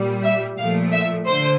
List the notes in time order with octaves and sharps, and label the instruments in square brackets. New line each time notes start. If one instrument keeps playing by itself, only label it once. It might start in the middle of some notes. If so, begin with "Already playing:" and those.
Already playing: [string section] A#2 G3
E5
A#2 F3 A3 F5
E5
D3 C5